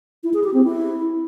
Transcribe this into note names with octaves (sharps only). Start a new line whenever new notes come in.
E4
G#4
G4
C4
E4